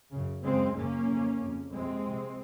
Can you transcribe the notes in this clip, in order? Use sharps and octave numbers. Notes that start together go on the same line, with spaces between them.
F#2 C#3
F#2 C#3 G#3 C4
F#2 C#3 A#3 C#4
F2 C#3
F2 C#3
F2 C3 G#3 C4
F2 C3